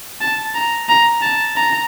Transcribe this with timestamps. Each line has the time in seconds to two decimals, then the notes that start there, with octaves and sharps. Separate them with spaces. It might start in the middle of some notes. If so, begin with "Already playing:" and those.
0.21 A5
0.55 A#5
0.89 A#5
1.22 A5
1.56 A#5